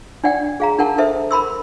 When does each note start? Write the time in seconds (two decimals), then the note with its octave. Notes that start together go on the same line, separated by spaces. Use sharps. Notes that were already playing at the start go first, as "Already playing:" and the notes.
0.24 D4 D5 F#5 G5
0.60 G#4 F5 A#5
0.79 D4 A#4 F#5 A5
0.98 A4 C5 E5
1.31 A#4 B5 C6 E6